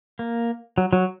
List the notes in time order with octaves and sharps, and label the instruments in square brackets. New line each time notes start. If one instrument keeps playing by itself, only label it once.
[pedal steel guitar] A#3
F#3
F#3